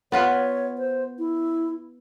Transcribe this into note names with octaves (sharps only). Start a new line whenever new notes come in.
B3 F4 B4 C#5
C5
E4